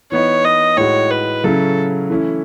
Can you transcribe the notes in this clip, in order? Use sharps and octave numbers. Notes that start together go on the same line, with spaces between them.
E3 B3 D#4 C#5
D#5
A2 G#3 D#4 F#4 C#5
B4
C#3 F#3 C#4 E4 A4
E3 A3 C#4 E4